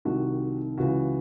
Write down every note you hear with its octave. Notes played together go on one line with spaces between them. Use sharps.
C2 C3 D#3 F#4
C#2 C#3 E3 F#4